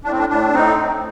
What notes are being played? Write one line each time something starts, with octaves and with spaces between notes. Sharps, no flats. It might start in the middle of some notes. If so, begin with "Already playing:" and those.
A2 D4
C4
D4
A2 D4
A2 C4 D#4
A2